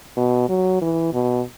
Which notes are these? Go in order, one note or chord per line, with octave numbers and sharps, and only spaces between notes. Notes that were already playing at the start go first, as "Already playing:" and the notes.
B2
F#3
E3
B2